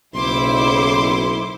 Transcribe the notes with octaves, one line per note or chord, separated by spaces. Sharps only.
F#1 B1 E4 C5 C6 D6